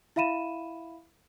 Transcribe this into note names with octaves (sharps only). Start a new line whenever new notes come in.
E4 E5 F5 B5 D#7 E7